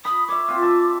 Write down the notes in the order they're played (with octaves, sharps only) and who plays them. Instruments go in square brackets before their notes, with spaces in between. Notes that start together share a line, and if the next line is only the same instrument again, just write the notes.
[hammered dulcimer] B5 [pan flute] D#6
[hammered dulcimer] C#5 E5 [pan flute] D6
[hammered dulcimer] C4 F4
E5 A5